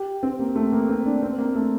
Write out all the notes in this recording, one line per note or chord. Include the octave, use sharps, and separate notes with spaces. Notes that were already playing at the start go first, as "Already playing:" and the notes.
Already playing: G4
C4
A#3
A3
A#3
C4
D4
C4
A#3
A3